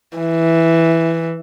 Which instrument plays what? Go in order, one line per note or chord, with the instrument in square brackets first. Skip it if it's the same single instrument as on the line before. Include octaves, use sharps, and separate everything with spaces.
[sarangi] E3